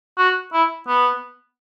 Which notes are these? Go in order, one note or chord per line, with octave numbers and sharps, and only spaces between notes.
F#4
E4
B3